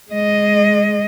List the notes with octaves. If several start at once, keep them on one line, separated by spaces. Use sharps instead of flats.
G#3 D#5